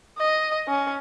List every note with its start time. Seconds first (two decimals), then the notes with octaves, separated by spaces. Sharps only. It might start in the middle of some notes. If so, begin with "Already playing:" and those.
0.18 D#5
0.68 C#4